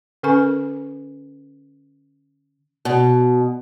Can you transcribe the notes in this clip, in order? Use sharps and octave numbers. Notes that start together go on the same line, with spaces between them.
D3 C#4 A4 A#4 G#5 C#6
B2